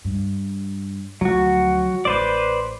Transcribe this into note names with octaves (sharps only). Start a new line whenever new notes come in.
G2
D2 F3 F#3 F#4
A1 B4 C5 D5